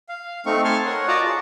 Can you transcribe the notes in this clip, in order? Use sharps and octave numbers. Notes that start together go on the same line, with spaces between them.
F5
A3 C4 D#4 F5 C#6
G#5 A5 C6 C#6 F6
A#4 C#5 F#5
F4 F#4 D5 D#5 A5 A#5
G#4 D5